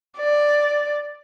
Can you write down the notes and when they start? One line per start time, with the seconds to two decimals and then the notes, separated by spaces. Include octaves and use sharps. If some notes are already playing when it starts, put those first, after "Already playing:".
0.18 D5